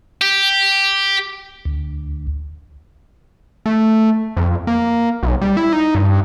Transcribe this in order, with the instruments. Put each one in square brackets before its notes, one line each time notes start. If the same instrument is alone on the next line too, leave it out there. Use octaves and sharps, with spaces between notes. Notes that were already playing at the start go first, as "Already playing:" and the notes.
[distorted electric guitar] G4
[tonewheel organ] D2
[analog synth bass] A3
F2
A#3
B1
G3
E4
D#4
G2